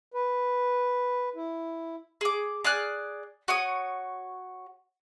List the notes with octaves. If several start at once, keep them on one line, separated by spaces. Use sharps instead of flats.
B4
E4
G#4 D6
G#4 D5 F6 F#6
F#4 C#5 D#6